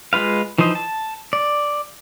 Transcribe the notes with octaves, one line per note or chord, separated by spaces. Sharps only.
G#3 F4 B4 F5
E3 F3 D#4 C5 D#5
A5
D5